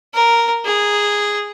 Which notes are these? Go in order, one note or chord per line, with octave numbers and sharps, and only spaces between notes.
A#4
G#4